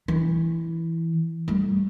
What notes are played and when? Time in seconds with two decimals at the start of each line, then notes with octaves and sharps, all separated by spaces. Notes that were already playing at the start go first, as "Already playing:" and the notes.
0.08 E3
1.48 G3 A3